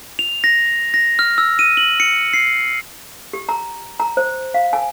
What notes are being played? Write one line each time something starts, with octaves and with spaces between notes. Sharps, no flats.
F7
A#6
A#6
F6
E6
D#7
F#7
C#7
C7
G4
A#5
A#5
C5
F5
G#5